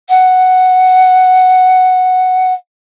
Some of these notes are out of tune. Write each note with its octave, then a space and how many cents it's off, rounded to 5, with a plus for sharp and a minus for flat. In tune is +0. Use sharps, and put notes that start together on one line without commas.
F#5 +0